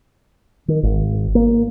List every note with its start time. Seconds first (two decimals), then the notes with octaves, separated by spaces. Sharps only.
0.68 D#3
0.83 G#1
1.35 A#3